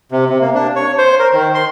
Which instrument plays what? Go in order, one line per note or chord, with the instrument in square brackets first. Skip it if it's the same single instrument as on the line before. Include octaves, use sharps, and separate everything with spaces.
[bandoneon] C3
C3
A#3
D4
C#5
C5
A#4
D#3
C6